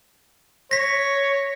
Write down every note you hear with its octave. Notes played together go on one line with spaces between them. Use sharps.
C#5 A#6 B6